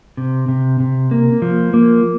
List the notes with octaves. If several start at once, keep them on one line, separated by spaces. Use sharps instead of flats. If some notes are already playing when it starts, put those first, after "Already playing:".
C3
C3
C3
A#3
F3
A#3